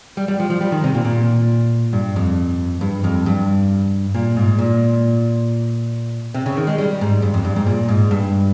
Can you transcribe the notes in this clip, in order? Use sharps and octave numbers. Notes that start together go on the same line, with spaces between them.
G3
G3
F3
F3
G3
D#3
C3
A#2
A#2
G2
F2
G2
F2
G2
A#2
G#2
A#2
C3
C#3
D#3
G#3
G3
G#2
G2
F2
G2
G#2
A#2
G#2
G2